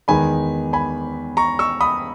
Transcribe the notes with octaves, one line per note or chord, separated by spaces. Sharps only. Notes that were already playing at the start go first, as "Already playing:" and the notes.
E2 D#3 G#3 B3 G#5 B5
G#5 B5
A#5 C#6
C#6 E6
B5 D#6